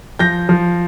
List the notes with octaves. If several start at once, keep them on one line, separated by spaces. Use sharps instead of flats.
F3 G6 A#6
F3